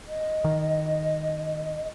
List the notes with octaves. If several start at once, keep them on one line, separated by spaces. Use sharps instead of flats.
D#5
D#3